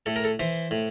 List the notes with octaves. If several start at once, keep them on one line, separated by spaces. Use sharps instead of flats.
A2 A4
A#4
A4
E3 C5
A2